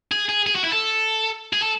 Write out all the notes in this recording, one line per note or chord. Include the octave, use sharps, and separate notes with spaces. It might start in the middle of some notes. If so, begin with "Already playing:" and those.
G#4
G#4
G#4
F#4
E4
A4
G#4
A4